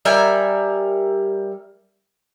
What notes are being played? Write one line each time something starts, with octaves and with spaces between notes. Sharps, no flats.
G3 A#4 E5 G#5